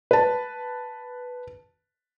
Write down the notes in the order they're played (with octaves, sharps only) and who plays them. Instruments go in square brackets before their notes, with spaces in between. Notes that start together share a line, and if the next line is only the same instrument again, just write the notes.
[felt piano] B4 A5